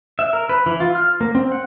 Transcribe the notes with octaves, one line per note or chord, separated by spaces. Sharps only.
E5
A#4
B4
E3
F4
F6
A#3
C4
F#5